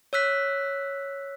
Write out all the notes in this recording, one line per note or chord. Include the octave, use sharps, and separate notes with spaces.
C#5 E6 F#6 B6